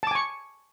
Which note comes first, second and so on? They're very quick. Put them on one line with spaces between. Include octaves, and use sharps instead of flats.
A5 D6 G#5 C#6